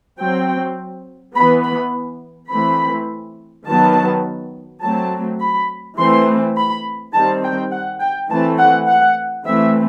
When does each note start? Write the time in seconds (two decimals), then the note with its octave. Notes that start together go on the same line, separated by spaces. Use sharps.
0.19 F#3 C4 G5
1.35 B3 B5
1.39 E3
1.63 B5
2.50 E3 A3 C4 B5
3.67 D#3 F#3 B3 A5
4.82 F#3 A3 C4 A5
5.40 B5
5.98 E3 A3 C4 C6
6.56 B5
7.14 D#3 G3 C4 A5
7.43 G5
7.71 F#5
8.00 G5
8.30 E3 A3 C4 A5
8.59 F#5
8.88 F#5
9.45 E3 A3 C4 E5